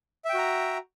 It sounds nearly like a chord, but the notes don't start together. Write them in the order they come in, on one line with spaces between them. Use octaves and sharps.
E5 G5 F#4 A#5